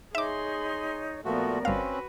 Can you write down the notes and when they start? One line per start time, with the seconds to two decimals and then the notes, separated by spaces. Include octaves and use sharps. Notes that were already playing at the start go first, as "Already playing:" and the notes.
0.15 D#4 G#4 C#5 E5 C6 D6
1.25 A#2 F3 A3 B3 F#4 A#4 D5
1.65 G1 C4 C#4 F#4 B4 F5